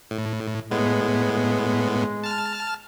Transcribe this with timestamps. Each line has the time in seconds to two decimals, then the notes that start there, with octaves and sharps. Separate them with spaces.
0.11 A2
0.71 A2 G#3 B3
2.24 A5 F6